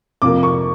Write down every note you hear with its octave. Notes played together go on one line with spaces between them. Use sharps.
F2 C3 F3 A#3 D6
C#6